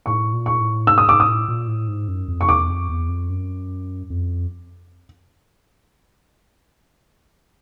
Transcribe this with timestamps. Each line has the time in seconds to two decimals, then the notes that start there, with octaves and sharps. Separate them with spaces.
0.06 A2 C#6
0.33 A#2
0.46 C#6
0.60 A2
0.87 G#2 E6
0.98 D#6
1.07 G#2 D6
1.20 D#6
1.27 A2
1.48 A#2
1.68 A2
1.88 G#2
2.08 F#2
2.28 F2
2.41 C#6
2.49 E2 D6
2.69 F2
2.89 E2
3.09 F2
3.30 F#2
4.10 F2